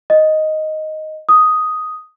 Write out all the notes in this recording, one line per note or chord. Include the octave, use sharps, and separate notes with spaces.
D#5
D#6